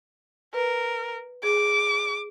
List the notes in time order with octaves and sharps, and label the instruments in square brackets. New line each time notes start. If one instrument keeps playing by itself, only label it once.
[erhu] A#4 [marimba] B4
[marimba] G#4 [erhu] D6